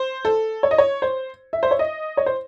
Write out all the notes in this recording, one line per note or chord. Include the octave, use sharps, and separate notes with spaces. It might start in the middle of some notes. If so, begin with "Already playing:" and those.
Already playing: C5
A4
C#5
D#5
C#5
C5
E5
C5
C#5
D#5
C#5
C5